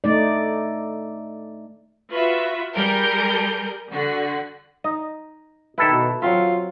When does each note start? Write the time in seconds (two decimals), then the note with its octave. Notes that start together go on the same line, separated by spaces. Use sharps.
0.04 A3 D#4 D5
2.11 F4 F#4 B4 E5
2.75 G3 G#4 A#4 G6
3.90 D3 F#4
4.84 D#4 D#5
5.78 D#3 E4 A4 B4
5.91 B2
6.22 F#3 C4 F4 E5